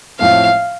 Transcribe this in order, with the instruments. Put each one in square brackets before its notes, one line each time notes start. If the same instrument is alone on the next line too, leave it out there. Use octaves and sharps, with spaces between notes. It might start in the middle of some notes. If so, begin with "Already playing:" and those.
[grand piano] A1 A2 F3 C4 [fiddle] F5